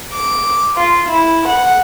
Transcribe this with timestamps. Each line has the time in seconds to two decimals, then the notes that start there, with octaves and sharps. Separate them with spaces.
0.13 D6
0.76 F4
1.08 E4
1.48 F#5